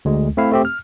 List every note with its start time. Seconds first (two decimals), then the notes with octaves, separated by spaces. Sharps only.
0.05 D2 G#3
0.37 A3 C4 E4 F5
0.52 A3 C4 G4
0.65 F6